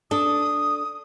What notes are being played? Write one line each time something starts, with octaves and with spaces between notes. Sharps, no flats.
D4 A4 D#6